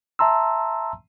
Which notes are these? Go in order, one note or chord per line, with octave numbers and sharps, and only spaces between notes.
E5 A5 A#5 C6 E6